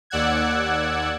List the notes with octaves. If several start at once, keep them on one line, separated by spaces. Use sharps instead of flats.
D#2 D5 F#5 E6 F#6 G#6